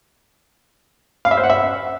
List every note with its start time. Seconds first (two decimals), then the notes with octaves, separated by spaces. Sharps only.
1.25 F5
1.31 E5
1.37 C5
1.43 F#5
1.50 E5